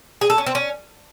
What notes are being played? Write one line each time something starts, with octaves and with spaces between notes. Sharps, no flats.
G#4
A4
C#4
C4
C#4